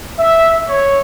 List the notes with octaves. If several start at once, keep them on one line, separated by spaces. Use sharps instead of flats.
E5
C#5